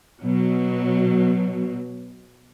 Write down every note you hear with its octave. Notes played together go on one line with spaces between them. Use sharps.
B2 F#3